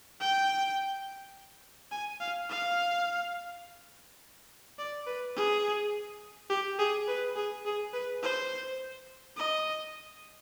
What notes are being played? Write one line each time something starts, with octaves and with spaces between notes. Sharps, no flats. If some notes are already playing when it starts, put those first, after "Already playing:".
G5
G#5
F5
F5
D5
B4
G#4
G4
G#4
B4
G#4
G#4
B4
C5
D#5